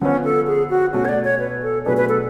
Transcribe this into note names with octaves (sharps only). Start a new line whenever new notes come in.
D3 F3 B3 C#4 F4
A4
G#4
F#4
B2 A3 C#4 F#4
C#5
D5
C#5
B4
A4
B2 F#3 A3 D4 G#4 B4
B4
A4